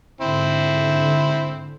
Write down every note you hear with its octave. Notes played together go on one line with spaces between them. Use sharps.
G#2 D3 C4 E4